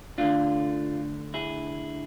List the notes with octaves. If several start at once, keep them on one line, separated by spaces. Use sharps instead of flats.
D3 A3 D4 F4
E4 G#4